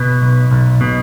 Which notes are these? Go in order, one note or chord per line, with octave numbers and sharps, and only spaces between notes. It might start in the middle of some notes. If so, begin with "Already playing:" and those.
Already playing: B2 B4
B1
B1
B2